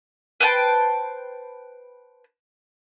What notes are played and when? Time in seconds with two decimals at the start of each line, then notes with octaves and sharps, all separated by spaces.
0.40 B4 C5 G5 A5